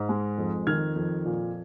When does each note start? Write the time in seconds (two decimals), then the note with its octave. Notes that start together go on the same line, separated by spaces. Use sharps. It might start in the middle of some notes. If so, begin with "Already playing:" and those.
Already playing: G#2
0.09 G#3
0.38 F2
0.67 D#3 F6 G#6
0.96 F2
1.25 A#2